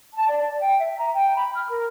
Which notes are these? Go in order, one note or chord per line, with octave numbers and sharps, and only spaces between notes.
A5
D5
D5
G5
E5
A#5
G5
B5
F6
A#4